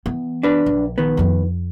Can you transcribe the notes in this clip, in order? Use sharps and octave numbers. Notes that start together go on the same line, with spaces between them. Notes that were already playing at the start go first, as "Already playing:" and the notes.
E3 B3
D4 B4
A#1
D#3 B3
F2 F4